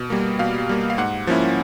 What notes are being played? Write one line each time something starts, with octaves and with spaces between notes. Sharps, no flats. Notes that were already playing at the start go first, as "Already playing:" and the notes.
Already playing: B2
G3 A#3
B2 F5
G3 A#3
F5
G#2 F#5
F3 A#3 C#4 E4